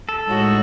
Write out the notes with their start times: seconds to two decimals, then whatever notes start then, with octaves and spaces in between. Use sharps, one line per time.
0.09 A4
0.28 A2 G#3 D#4 F#4 C#5